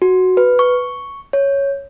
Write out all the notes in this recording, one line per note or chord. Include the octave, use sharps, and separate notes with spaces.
F#4
B4
C#6
C#5